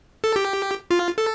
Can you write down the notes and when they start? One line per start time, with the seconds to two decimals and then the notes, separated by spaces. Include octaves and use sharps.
0.24 A4
0.36 G4
0.91 F4
1.18 A4